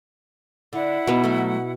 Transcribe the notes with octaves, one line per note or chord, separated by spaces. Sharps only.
D3 E4 F#5
B2 B3 D#4 B4
F#3 A3